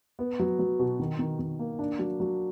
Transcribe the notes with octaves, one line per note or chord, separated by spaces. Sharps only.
B3
F#3
F#3
B2
D#3
D#3
D#3
A#3
D4
F#3
F#3